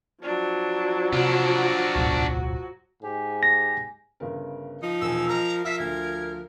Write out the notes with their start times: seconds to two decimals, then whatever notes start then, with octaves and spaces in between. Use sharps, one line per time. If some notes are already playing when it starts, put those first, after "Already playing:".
0.22 F3 F#3 D4
1.13 C3 D4 F4 F#4
1.96 D1 B1 G#2
3.03 G#2 G4 G#5
3.43 A#6
4.20 G1 C#3 A#4
4.83 F3 D#4
5.01 E1 G#5 E6
5.29 A#4 D#5 A#5
5.65 F3 E5 E6 B6 C7
5.79 D2 G#6